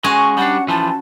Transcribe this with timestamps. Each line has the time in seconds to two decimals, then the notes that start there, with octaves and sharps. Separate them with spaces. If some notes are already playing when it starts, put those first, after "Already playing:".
0.04 G#3 C#4 F#4 G#5 C#6
0.37 G3 D4 F#5
0.68 E3 F3 A5